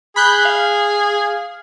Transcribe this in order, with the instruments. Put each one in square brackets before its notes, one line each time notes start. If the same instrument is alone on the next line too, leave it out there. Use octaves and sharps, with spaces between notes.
[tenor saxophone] G#4 [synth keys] B5 F#6 G6
[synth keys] F5